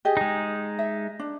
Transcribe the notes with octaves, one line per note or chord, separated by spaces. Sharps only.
G4 G#4 D#5
G#3 D#4
E5
D4